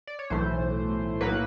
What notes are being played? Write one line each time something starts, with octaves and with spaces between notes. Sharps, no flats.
D5
C#5
B1 A2 E3 A3 C5
B1 A2 F#3 A#3 B4